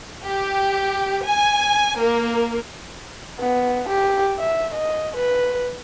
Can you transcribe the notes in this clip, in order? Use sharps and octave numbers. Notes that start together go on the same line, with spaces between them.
G4
G#5
A#3
B3
G4
E5
D#5
B4